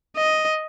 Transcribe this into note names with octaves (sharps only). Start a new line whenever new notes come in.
D#5